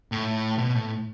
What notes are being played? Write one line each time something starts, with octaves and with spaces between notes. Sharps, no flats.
A2
B2
A2